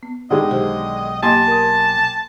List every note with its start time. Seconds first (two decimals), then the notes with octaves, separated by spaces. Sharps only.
0.03 B3
0.31 D3 D#3 G#3 D#5
0.51 B1 G4 G#4 C5
1.23 A#3 G4 D#5 G#5 A5 C6
1.48 A#4 D#6